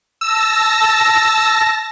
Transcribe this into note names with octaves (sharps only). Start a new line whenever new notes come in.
A5 E6 A#6